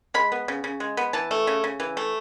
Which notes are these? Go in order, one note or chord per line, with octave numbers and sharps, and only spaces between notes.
G#3 B5
B3
C#3
C#3
G#3
B3
E3 A5
A3
C#3
C#3
E3
A3